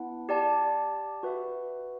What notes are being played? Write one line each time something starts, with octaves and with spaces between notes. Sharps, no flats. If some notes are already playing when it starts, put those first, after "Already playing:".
Already playing: B3 E4 B4 F#5 A5
G4 D5 A5
F#4 B4 E5